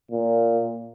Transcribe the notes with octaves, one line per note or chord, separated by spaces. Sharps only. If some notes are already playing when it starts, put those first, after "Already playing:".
A#2